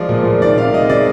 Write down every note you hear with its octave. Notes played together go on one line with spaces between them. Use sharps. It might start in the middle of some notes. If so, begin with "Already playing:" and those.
Already playing: F3 G#3 D5
A#2
A#2
D#3 D5
C3 F5
G#3 D#5
C3 D5